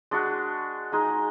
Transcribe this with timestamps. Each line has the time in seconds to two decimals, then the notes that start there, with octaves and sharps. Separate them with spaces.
0.11 G#3 D4 F#4
0.92 G#3 D#4 G#4